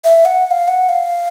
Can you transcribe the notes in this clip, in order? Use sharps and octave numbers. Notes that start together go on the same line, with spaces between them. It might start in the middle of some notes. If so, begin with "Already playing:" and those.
E5
F#5
F#5
F5
F#5
F5